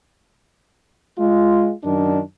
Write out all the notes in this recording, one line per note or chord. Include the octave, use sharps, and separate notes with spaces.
G#3 F4
F#2 D#3 D4